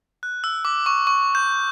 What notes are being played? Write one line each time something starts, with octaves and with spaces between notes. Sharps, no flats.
F#6
E6
D6
C#6
C#6
G6